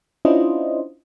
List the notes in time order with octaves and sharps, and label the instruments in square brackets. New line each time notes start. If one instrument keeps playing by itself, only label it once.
[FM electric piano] C#4 D4 E4 F4 C5 D#5